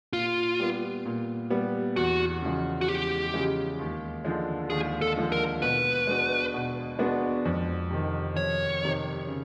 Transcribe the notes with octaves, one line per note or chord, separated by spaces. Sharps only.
A#2 F4
G3 B3
A#2
G3 B3
E2 F#4
C#3 F3 G#3
F#4
E2 G4
C#3 F3 G#3
D#2
D3 F3 G#3
D#2 G#4
A4
D3 F3 G#3
A#4
B2 B4
G#3 B3 D4 F#4
B2
G#3 B3 D4 F#4
F2
C3 D#3
F2 C#5
C3 D#3
C#3